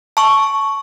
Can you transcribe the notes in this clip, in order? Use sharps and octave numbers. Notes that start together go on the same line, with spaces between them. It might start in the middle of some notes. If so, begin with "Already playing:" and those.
A5 C#6